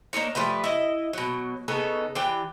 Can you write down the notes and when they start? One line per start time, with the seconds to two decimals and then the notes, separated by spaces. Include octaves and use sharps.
0.13 A#3 D4 D#4 C#5
0.35 F3 G3 A3 B4
0.64 E4 D#5
1.13 B2 F#3
1.68 C#3 B3 D#4 A4
2.15 E3 D4 G4 G5